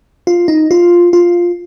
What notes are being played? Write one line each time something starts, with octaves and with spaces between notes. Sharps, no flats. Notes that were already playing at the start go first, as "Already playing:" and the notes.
F4
D#4
F4
F4